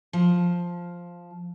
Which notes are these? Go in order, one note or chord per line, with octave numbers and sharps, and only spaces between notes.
F3